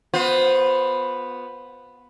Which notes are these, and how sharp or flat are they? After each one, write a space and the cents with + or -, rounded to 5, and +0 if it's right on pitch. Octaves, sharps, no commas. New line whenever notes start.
B3 +0 F4 +40 C5 +0